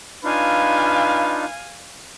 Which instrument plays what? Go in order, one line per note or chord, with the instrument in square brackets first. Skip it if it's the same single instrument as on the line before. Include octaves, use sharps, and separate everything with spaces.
[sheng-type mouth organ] D4 D#4 F4 [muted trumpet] B4 [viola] F5 G#5